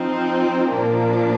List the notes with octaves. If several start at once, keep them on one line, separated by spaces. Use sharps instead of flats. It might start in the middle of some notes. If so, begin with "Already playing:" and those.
Already playing: F3 C4 D#4
A#2 F3 A#3 D4